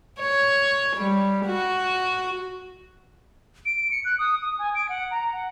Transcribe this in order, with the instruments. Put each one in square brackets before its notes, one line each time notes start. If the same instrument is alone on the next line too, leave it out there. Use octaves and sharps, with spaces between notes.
[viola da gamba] C#5
G3
F#4
[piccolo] D7
C#7
F#6
D#6
D#6
G#5
D7
F#5
A#5
F#5